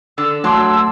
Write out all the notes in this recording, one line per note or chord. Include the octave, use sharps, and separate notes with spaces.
D3 E6
F#3 A3 A5 C6 D6